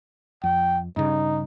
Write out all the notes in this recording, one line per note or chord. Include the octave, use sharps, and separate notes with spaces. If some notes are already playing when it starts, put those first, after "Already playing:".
F2 G5
G2 C#3 D#4